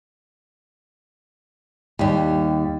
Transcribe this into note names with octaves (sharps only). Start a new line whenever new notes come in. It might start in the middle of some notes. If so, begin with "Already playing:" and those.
D#2 G3